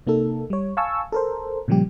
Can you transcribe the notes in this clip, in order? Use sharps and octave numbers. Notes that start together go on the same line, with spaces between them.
C3 A#3 D#4 A4
G3 C#5
F5 G#5 A5 C#6 E6
A4 A#4 C5
A#2 C#3 F3 G3 G4